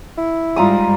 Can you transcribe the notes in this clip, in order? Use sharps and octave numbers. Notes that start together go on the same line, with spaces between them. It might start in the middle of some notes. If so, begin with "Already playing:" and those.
E4
G#2 G3 F4 A#5 D#6